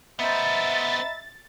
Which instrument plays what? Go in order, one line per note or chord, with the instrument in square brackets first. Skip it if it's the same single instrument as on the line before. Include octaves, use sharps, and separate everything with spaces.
[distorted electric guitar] B3 C5 [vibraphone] D#5 A#5 B5 [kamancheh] E5 [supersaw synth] A6